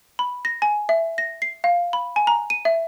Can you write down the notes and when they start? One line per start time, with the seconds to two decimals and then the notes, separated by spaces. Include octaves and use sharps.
0.19 B5
0.45 A#6
0.62 G#5
0.89 E5
1.18 A#6
1.42 C7
1.64 F5
1.93 B5
2.16 G#5
2.27 A#5
2.50 D#7
2.65 E5